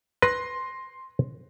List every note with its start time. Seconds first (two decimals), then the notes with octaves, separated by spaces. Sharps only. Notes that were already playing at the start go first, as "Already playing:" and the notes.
0.22 B4 C6 A#6